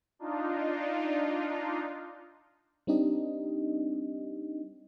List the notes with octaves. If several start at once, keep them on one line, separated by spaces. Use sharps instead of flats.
D4 D#4 F4
G3 C4 D4 D#4 G4 D#5